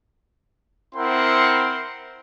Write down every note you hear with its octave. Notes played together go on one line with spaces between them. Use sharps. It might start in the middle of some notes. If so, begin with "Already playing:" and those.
C4 E4 A#4 F#5 C6